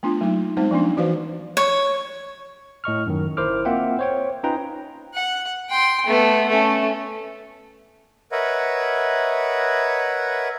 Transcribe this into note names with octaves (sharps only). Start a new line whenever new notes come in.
A3 B3 D4 F4
F#3 A3 A#3 D#4
G3 G#3 B3 C4 D#4 C5
F3 A#3 C#4 D4
E3 F#4 B4 C5 F5
C#5
A2 D#5 C#6 F6
F#2 D#3
G1 E4 A#4 C5 D6 F6
A#3 C4 F4 E5 F#5 G5
C5 C#5 G5
C#4 D#4 F4 B4 G5 A#5
F#5
G5 C6
A3 B3
A3 C#4
A#4 B4 C#5 D#5 E5 F#5